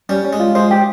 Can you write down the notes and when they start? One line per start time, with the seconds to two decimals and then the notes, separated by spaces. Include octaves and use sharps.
0.09 G3 C#4
0.24 C#4
0.33 G#3
0.39 F4
0.55 G#3 C5
0.71 G4